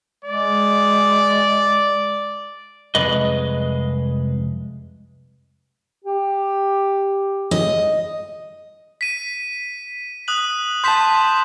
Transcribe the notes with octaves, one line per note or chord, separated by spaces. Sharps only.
G#3 D5
C2 F2 G#3 B4 D#5
G4
D#5
B6 D#7
D#6 F#6 F#7
A5 C6 G6 B6 E7